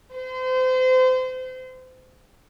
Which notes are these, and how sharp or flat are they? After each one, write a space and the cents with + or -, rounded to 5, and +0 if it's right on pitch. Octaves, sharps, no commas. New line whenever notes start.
C5 -30